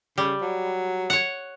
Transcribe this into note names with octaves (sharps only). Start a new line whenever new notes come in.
C#3 G3
F#3
C#5 F#5